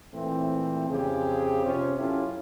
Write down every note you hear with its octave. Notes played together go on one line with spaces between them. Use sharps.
A#2 E3 A3 C4
F2 C#3 C4 G4 G#4
C3 C#4 F4
F#2 C#4 E4 F4 G4 A4